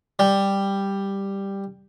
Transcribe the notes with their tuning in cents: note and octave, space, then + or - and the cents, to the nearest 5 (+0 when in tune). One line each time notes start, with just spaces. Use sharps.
G3 +5